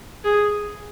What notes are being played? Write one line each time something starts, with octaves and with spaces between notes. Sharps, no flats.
G#4